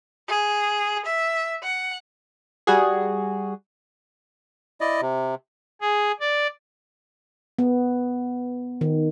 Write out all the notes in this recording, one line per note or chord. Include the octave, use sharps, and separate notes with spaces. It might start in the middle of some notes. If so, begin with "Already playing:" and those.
G#4
E5
F#5
G3 F#4 G#4
E4 D5 D#5
C3
G#4
D5
B3
D#3